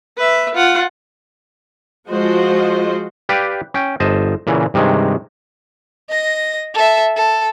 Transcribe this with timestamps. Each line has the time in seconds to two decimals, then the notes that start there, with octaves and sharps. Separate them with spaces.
0.17 B4 E5
0.55 F4 F#5
2.09 F3 G#3 F4 F#4 C5 D#5
3.29 G4 B4 D5 F5 G5
3.74 C#4 G5
4.00 G1 C5 D#5 A5
4.47 A#2 C#3 E3
4.74 G2 C3 D#3 G#3
6.09 D#5 A#6
6.74 A4 E5
7.16 A4